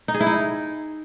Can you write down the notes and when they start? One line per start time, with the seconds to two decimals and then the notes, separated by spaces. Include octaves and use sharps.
0.08 D#4
0.14 G#4
0.21 E4
0.27 D#4